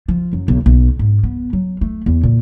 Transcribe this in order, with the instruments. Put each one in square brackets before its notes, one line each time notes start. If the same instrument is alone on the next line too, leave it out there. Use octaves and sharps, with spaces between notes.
[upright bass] F3
F#2
B1
B1
G#2
B3
F#3
A3
E2
A#2